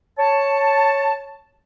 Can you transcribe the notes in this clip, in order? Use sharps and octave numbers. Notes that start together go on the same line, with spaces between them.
C#5 A5